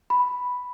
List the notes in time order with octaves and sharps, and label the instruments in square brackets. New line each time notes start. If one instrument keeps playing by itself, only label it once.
[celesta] B5